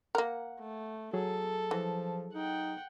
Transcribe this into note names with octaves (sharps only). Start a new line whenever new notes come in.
A#3 A#4 F#5
A3
F#3 G#4 A4
E3 F3
D#4 F#5 G5